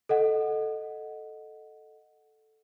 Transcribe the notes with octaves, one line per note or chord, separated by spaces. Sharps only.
A4 D#5 F#5